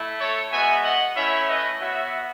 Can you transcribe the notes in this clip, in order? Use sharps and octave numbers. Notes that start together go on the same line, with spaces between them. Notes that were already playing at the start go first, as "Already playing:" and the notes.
Already playing: A3 E4
A4 C#5
G#3 B3 F#4 E5 G#5
D#5 F#5
A3 C#4 E4 C#5 E5
B4 D#5
B3 F#4 C#5 E5